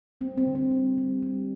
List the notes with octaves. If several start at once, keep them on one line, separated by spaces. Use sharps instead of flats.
G3 C4
C4
D3
C4
G3
G3
G3